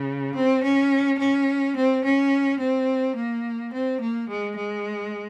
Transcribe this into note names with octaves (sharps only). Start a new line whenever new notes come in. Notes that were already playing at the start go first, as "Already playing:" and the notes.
Already playing: C#3
C4
C#4
C#4
C4
C#4
C4
A#3
C4
A#3
G#3
G#3